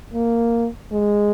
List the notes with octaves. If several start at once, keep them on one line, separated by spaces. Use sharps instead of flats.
A#3
G#3